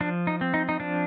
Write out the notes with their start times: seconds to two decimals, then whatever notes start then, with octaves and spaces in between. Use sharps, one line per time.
0.01 F3 D4
0.27 D#4
0.41 C4
0.54 D#4
0.69 D#4
0.80 F3 D4